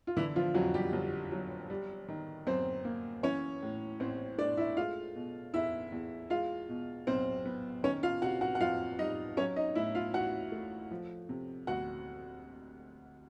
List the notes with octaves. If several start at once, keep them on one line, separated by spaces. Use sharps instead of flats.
F4
D3 E3 E4
F3 F4
F2 F#3 F#4
G3 G4
G1
F#3
G3
D#3
F#2 C4 C5
A#3
E3 C#4 C#5
A2
A1 C4 C5
A3 D4 D5
E4 E5
G#3 F4 F5
B2
E2 E4 E5
E2
G#3 F4 F5
B2
B1 C4 C5
B3
D#3 C#4 C#5
F4 F5
C3 F#4 F#5
F#4 F#5
F#5
F2 F4 F5
G3 D#4 D#5
F#3 C#4 C#5
D#4 D#5
A2 E4 E5
F4 F5
A1 F#4 F#5
A3
F3
C3
D2 F#4 F#5